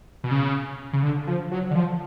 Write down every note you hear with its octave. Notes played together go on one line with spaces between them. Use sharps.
B2
C#3
C#3
D3
F3
F#3
D3
F3